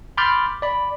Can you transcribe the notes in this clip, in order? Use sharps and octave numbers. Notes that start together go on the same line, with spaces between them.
B5 C6 D6 F6 G6 A6
D5 B5